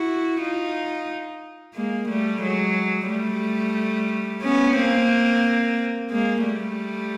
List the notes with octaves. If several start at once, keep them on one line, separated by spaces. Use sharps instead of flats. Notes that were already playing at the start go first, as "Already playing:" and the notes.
Already playing: E4 F#4
D#4 F4
G#3 A#3
G3 A3
F#3 G#3
G3 A3
B3 C#4
A#3 C4
G#3 A#3
G3 A3